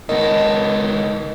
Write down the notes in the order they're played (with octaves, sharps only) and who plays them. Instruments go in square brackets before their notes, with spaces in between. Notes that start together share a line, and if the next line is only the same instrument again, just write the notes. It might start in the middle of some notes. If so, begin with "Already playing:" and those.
[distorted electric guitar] C#2 A4 [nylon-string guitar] D#3 B3 [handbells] D#5